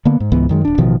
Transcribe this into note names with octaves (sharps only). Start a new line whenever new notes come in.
D3 A#3 B3
G#2
C#2 G#2 E3 B3
F#2 D#3 G#3
D#1 D4
A1 B2 D#3 F3